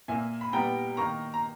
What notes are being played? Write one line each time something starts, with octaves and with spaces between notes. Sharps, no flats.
A#2 A#3 E5 G#5
B5
A#2 G3 B3 G5 A#5
D#3 A#3 A#5 C#6
A#5